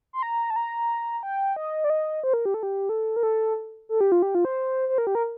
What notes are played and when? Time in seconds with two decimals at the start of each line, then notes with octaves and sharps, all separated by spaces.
0.13 C6
0.22 A#5
0.50 A5
0.56 A#5
1.23 G5
1.56 D#5
1.84 D5
1.90 D#5
2.24 C5
2.34 A#4
2.45 G4
2.54 A4
2.63 G4
2.89 A4
3.16 A#4
3.23 A4
3.89 A4
4.01 G4
4.12 F4
4.22 G4
4.35 F4
4.45 C5
4.89 C5
4.98 A#4
5.07 G4
5.15 A#4